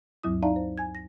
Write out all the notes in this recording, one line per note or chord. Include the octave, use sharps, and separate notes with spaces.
D2 G2 F#3 E4 D#6
D#4 D5 E5 F5 A5 A#5
C5
G#5 G#6
A#6